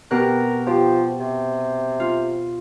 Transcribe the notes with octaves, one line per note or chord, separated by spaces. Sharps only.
B2 G4 A#4 F#6
F3 G4
C3
F4